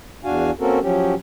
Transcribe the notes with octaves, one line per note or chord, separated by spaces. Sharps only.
E2 D4 F#4 F5 G#5
A#3 C4 C#4 F#4 A4 A#4
F3 F#3 C#4 G4